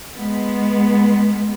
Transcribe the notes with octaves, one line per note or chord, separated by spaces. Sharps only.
G#3 B3